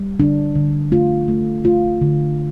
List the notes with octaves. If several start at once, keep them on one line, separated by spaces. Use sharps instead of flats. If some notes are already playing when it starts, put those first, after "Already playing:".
Already playing: G3
D3 D4
D3
A3 F4
A3
A3 F4
D3